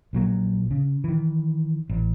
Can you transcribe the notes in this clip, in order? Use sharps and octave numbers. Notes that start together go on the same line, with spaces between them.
A#1 A#2 F#3 A#3
C#3
D#3 E3
A1